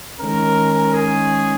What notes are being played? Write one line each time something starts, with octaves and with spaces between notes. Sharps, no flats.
D#3 G#3 C#4 A#4
G#4